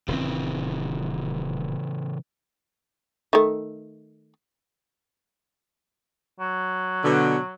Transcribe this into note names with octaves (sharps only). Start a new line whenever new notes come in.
D#1 C#3 E3 C4
D#3 A3
F#3
B2 D3